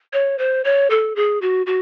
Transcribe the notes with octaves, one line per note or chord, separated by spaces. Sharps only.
C#5
C5
C#5
A4
G#4
F#4
F#4